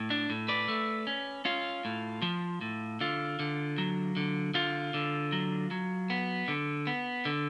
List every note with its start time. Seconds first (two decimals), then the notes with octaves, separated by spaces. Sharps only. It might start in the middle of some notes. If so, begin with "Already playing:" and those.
Already playing: A2
0.10 D4
0.30 A2
0.48 B4 D5
0.68 A3
1.07 C#4
1.45 C#4 F4
1.85 A2
2.22 F3
2.61 A2
3.01 D3 F4
3.39 D3
3.78 F#3
4.17 D3
4.54 D3 F4
4.94 D3
5.32 F#3
5.71 F#3
6.10 B3
6.48 D3
6.87 B3
7.25 D3